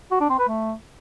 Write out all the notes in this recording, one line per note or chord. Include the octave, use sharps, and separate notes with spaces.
F#4
D4
C4
B4
A3